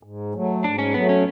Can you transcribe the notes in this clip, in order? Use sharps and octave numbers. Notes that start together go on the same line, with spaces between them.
G#2
F#3 A3
G#2 D4
C#4
F#3 A3 B3
C#4